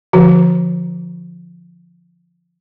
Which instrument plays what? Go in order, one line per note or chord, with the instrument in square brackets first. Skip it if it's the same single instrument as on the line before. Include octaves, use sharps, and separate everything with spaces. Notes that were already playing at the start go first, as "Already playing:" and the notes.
[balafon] D3 F3 F#4